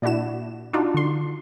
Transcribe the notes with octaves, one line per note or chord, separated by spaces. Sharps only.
A#2 D4 E4 F#4 E7
D4 D#4 F4 F#4
D3 C6